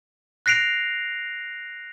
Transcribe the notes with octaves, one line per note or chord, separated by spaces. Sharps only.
F#6 A#6 C7 D7 F7